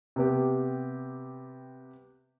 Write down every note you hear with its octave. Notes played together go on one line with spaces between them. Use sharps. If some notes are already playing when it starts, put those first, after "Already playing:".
C3 B3 G4